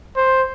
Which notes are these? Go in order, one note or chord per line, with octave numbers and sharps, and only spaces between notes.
C5